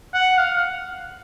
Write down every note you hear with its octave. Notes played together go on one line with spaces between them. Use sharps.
F#5
F5